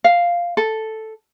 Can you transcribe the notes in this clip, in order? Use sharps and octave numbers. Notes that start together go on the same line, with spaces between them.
F5
A4